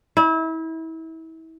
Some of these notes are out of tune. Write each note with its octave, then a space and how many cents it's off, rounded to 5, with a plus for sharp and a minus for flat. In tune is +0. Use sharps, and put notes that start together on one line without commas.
E4 -30